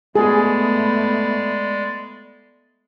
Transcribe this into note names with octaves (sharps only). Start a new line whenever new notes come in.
G#3 A3 B3 G#4 D5